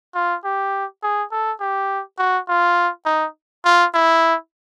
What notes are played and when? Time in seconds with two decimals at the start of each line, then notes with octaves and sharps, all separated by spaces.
0.15 F4
0.45 G4
1.03 G#4
1.32 A4
1.61 G4
2.19 F#4
2.49 F4
3.06 D#4
3.65 F4
3.94 E4